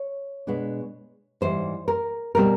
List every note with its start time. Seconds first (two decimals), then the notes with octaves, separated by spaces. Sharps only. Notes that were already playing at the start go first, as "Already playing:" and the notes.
Already playing: C#5
0.47 B2 G#3 B3 D4
1.41 G#2 E3 G3 C5
1.88 A#4
2.35 B2 G3 C4 A#4